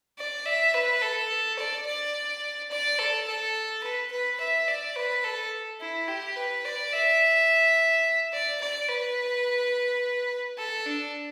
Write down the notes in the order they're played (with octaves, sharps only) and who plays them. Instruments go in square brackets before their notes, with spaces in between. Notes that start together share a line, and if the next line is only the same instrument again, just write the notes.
[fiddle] D5
E5
B4
A4
D5
D5
D5
A4
A4
B4
B4
E5
D5
B4
A4
E4
G4
B4
D5
E5
D5
D5
B4
A4
D4